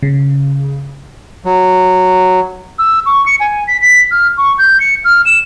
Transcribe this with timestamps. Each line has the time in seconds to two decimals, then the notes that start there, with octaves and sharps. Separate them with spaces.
0.03 C#3
1.45 F#3
2.79 E6
3.06 C#6
3.26 C#7
3.40 G#5
3.68 B6
3.82 B6
4.11 F6
4.37 C#6
4.59 G6
4.80 C#7
5.05 F6
5.25 E7